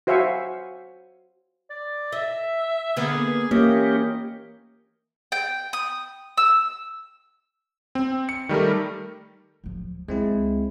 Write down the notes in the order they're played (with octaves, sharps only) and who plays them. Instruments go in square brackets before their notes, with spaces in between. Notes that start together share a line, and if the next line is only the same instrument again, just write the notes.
[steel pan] F#4 C5 E5 F5 G#5 C#6
[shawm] D5
[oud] D#5 [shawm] E5
[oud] D3 A#3 B3 [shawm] G#4
[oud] E3 [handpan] A#3 [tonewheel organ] C#4 G4 [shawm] D#5
[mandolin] G5
D#6
E6
[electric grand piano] C4
C#7
D#3 G3 A3 A#4
[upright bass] D1 F3
[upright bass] C#2 [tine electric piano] G#3 C4 E4